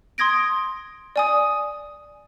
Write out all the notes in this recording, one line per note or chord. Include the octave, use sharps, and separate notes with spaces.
C6 D#6 G#6 A#6 D7
D5 G#5 D#6